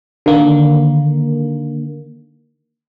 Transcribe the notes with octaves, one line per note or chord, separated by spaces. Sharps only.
D3 D#3 A#3